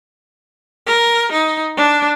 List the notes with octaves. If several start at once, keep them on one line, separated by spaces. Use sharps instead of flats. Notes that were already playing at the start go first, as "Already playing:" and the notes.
A#4
D#4
D4